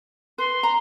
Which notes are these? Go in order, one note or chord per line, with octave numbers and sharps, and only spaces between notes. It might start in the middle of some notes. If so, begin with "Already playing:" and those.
B4 C6
A#5